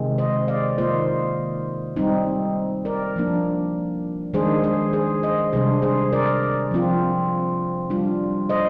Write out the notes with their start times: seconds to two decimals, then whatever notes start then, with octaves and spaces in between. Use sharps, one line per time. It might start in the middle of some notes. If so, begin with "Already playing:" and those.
Already playing: C3 D#3 G#3 C4
0.18 C5 D#5
0.48 D5 F5
0.78 D#3 A#3 F4 C5 D#5
1.96 G3 C4 D#4
2.85 A#4 D5
3.16 F3 A#3 D4
4.34 D#3 G#3 D4 G#4 C5
4.64 G#4 C5
4.93 G#4 C5
5.23 C5 D#5
5.53 C3 G3 D4 G#4 C5
5.82 G#4 C5
6.13 A#4 D5
6.71 F3 C4 F4
7.90 G3 D4 F4
8.49 C5 D#5